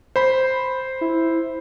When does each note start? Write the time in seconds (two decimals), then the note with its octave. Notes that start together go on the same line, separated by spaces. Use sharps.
0.16 C5 B5
1.01 E4